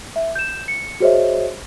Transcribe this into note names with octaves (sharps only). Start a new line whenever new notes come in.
E5
G6 E7
C#7
F#4 G#4 C5 C#5 D#5 E5